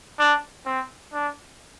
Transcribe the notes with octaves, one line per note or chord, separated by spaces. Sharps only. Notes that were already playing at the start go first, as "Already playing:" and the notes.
D4
C4
D4